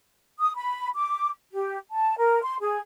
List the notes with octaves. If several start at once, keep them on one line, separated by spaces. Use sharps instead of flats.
D#6
B5
D6
G4
A5
A#4
C6
G#4